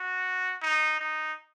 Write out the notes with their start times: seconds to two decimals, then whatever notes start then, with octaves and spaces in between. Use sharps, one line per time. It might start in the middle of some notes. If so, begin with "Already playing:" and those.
Already playing: F#4
0.62 D#4
0.99 D#4